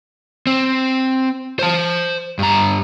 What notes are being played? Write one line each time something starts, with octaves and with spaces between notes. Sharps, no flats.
C4
C5 A5
G2 A#5